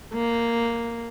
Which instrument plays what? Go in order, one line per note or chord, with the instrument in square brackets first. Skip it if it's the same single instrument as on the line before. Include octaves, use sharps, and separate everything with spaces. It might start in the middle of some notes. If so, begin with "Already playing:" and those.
[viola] A#3